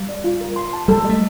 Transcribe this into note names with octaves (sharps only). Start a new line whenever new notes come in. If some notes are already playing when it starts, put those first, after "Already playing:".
Already playing: G3 F5
D5
F4
A#4
C6
A5
G3 A4
A3 D#5